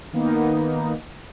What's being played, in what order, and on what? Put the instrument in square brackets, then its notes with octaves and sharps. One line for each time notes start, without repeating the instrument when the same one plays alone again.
[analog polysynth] D#3 A#3 B3 D#4